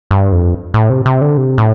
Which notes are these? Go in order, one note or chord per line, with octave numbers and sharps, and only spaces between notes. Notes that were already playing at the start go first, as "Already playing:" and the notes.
G2
F2
A2
C3
C3
D3
C3
A2